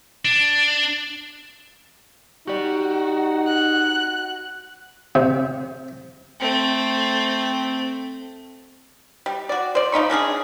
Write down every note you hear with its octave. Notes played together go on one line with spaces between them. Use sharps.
D4
D#4 F#4 G4 D5
F#6
C3
A3 C4
G3
F#4 D5
C5 D5
F3 D#4 B5 C#6
C#4 D4 F#4 G#4